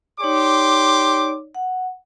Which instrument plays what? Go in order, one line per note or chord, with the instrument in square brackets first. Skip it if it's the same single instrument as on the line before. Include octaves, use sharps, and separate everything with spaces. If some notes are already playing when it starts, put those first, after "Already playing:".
[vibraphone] D#4 C#5 D5 [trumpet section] G4 C6 D6
[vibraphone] F#5